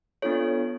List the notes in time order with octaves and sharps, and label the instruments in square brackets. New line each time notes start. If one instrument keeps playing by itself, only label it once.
[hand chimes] B3 D4 F4 A4 C#5